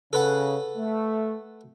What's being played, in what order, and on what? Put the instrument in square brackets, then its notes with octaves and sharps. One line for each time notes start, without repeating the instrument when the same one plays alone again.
[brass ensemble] C#3 [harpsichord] A4 B4 F#5
[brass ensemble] A3